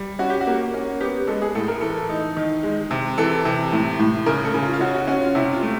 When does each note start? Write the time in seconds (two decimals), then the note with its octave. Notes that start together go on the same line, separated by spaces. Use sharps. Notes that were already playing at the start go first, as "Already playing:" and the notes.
Already playing: G3
0.19 C#4 F#4
0.30 G4
0.41 F#4
0.47 A#3
0.74 C#4
1.01 B3 G4
1.27 G#3 A4
1.42 G#4
1.55 A2 A4
1.68 A#4
1.81 E3 A4
2.09 D#4
2.37 D#3
2.63 G#3
2.91 C3
3.18 E3 A4
3.45 C3
3.72 A2
3.99 A2
4.26 C#3 A#4
4.45 A4
4.54 C#3
4.63 F4
4.73 F4
4.80 C#4 F#4
4.94 F#4
5.07 C#4 F#4
5.21 F4
5.35 C3 E4
5.53 F4
5.63 A3